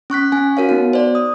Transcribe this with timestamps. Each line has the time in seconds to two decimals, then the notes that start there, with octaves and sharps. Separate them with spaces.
0.10 C#4 C#6 F#6 B6
0.32 C#4 G#5
0.57 F#4 A#4 C#5 F5
0.69 B3 D#4 F#4
0.93 C5 D5
1.15 D#6